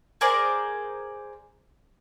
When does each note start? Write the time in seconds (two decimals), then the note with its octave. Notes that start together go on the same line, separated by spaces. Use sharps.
0.21 G#4 A#4 C5 D5